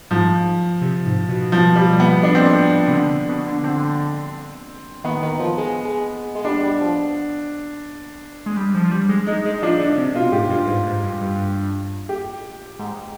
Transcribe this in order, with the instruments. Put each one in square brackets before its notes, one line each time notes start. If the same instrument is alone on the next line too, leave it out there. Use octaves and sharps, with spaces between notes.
[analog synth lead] G#2 [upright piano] F3
[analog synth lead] C3
G#2
B2
[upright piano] F3
G3
B3
D4
C4
D4
[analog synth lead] C3
D3
B2
D3
[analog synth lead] D3 [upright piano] C4
[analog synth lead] D#3 [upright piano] B3
[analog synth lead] D#3
F3
G#3
G#3
G#3
[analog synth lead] G3 [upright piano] D4
[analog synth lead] G3
F3
G#3
G3
F3
F3
G3
G#3
[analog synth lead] G#3 [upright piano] D#4
[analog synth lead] G#3
[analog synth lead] F3 [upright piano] D4
[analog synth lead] D3
C3
[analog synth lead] B2 [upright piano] F4
[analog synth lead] G#2 [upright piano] G4
[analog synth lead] G2 [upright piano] F4
[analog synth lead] G#2
G#2
G2
G2
[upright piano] G4
[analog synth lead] G#2